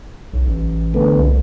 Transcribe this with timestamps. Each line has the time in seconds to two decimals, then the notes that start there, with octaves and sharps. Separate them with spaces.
0.33 B1
0.47 A1
0.94 D3 A3 B3
1.16 C2